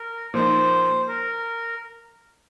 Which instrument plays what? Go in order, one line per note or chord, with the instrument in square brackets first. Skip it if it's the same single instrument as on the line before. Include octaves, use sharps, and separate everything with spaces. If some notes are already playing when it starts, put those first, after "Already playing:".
Already playing: [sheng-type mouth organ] A#4
[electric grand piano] A#2 F3 A#3 D#4 [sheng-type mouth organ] C5
[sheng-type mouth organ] A#4